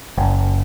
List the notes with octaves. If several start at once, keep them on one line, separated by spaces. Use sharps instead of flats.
F#1